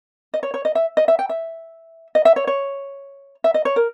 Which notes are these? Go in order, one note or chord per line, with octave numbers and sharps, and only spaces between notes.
D#5
C#5
C#5
D#5
E5
D#5
E5
G5
E5
D#5
E5
C#5
C#5
E5
D#5
C#5
A#4